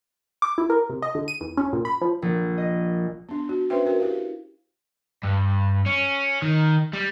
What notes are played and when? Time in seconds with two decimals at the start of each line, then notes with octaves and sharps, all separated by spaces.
0.42 D6
0.58 E4
0.70 A#4
0.90 C3
1.02 D#5
1.15 D3
1.28 D#7
1.41 E2
1.57 C#4
1.73 A#2
1.85 B5
2.01 F3
2.22 A#1
2.58 D#5
3.29 B3 D4
3.49 F#4
3.70 C#4 D4 B4 C5 E5 G5
3.86 F#4 A#4 G5
4.00 E4 G4 F5
5.23 G2
5.86 C#4
6.42 D#3
6.94 G3